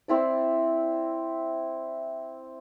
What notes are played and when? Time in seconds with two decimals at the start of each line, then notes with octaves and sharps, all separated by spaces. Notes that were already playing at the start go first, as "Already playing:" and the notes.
0.08 C4 E4 D5